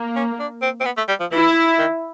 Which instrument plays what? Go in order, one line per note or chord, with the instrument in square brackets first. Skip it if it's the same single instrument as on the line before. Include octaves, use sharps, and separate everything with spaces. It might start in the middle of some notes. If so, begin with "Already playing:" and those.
Already playing: [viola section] A#3
[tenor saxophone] C#4
D4
C4
C4
B3
A3
G3
F3
[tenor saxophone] E3 [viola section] E4
[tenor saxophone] D#3